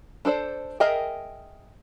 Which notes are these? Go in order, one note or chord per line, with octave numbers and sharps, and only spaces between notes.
D4 A4 C5 D5
G#4 A#4 D#5 E5 G5